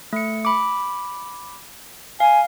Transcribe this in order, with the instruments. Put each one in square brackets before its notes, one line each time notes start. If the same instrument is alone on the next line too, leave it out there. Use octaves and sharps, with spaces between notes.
[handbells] A3 C#7
B5 D6
[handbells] F5 [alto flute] G#5